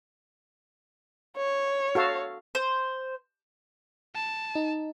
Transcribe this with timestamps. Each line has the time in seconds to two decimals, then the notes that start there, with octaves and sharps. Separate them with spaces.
1.37 C#5
1.95 F#4 A4 F5
2.55 C5
4.15 A5
4.55 D#4